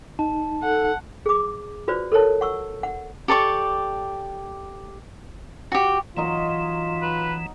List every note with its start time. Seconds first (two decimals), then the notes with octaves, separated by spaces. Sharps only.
0.19 D#4 A5
0.63 A4 F#5
1.26 G#4 D6
1.88 F4 F#4 B4 C5 D5
2.12 A4 A#4 C#5 A5
2.41 F#5 C#6 E6
2.83 F#5
3.28 G4 A4 D5 C#6
5.72 F#4 G4
6.17 E3 F#3 D#4 F4 D#5
7.02 B4